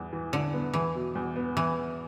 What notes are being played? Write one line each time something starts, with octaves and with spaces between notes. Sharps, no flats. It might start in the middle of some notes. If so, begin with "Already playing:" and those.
Already playing: E2 B3
E3
D3 E4
B3
E2 E3
B2
E2
B3
E3